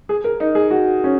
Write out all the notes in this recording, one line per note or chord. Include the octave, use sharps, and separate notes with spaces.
G#4
A#4
D#4
G#4
F#4
C#4